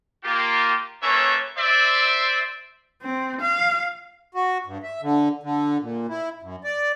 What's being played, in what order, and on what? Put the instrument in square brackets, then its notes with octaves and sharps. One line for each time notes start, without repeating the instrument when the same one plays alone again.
[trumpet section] A#3 F4 G4
A#3 C#4 A4 B4 C#5 E5
C5 D5 E5
[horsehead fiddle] C4
F5
[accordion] F#4
G2
E5
D3
D3
A#2
E4
F#2
D5